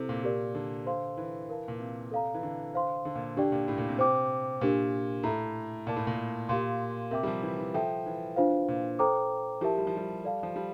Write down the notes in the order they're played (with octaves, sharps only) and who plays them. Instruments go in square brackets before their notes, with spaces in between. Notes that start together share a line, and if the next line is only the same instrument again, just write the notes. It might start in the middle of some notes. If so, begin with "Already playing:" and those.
Already playing: [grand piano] C3 [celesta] E4 A4 C5
[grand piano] A#2
[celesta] G4 A#4 D5
[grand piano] D3
[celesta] A4 C5 F5 C6
[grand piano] E3
[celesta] A#4 F5 A5
[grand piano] A#2
C3
[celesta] A4 D5 F5 A#5
[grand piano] E3
D3
[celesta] C5 F5 C6
[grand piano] D3
A#2
[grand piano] D3 [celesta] D4 G4 D5 G5
[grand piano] A#2
A2
A#2
C3
[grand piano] C3 [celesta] C5 G5 D6
[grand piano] A#2 [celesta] D4 G4 A#4
[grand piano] A2 [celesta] A4 E5 A#5
[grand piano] A#2 [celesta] A#4 D5 A5 D6
[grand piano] A2
A#2
[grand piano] A#2 [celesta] G4 A#4 F5 C6
[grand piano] C3 [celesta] A#4 E5 G5 D6
[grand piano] G3
F3
E3
E3
[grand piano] F3 [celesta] A4 E5 G5
[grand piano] E3
[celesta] D4 F4 C5 F5
[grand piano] A#2
[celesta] A4 C5 G5 A#5 D6
[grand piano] F3 [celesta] E4 G4 A#4 E5 A5
[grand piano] G3
F3
G3
[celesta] A4 D5 F5 A5
[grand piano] F3
G3